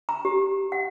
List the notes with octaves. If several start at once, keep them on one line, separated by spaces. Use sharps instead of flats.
A#5
G4
F#5